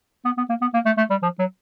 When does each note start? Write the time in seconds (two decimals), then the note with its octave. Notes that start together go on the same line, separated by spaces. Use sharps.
0.25 B3
0.37 B3
0.49 A#3
0.61 B3
0.74 A#3
0.86 A3
0.98 A3
1.10 G3
1.22 F3
1.39 F#3